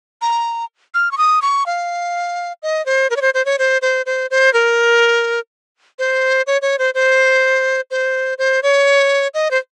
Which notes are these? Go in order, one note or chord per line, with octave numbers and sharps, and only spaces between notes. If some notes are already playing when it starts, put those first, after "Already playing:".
A#5
F6
C#6
D#6
C#6
F5
D#5
C5
A#4
C#5
C5
C5
C#5
C5
C5
C5
C5
A#4
C5
C#5
C#5
C5
C5
C5
C5
C#5
D#5
C5